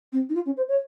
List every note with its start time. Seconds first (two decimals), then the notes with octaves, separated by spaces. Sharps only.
0.13 C4
0.29 D#4
0.35 F4
0.46 C#4
0.57 C5
0.68 C#5